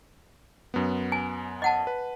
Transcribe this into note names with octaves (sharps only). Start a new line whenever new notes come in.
F#2 B3
G#5
D#5 F#5 A5
B4